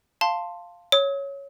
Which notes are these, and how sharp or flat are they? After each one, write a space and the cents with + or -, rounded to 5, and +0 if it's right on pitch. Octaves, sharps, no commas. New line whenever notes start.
F5 +0 A5 +10 C6 +0
C#5 +0 D#6 +45